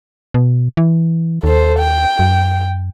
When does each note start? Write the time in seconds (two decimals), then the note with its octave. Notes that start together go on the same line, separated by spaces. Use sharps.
0.34 B2
0.77 E3
1.43 D#2 A4 C5
1.79 G5
2.19 F#2